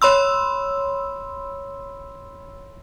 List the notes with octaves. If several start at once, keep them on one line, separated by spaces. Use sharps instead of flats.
C#5 B5 C6 E6